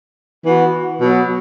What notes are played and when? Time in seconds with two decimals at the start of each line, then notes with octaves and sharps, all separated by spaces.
0.46 E3 B3 F#4
1.01 B2 F#3 B3